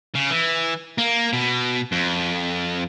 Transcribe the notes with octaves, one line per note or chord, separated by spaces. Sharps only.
C#3
E3
A#3
B2
F2